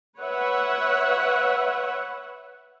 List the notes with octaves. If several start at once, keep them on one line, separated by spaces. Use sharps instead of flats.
B4 C#5 E5 F#5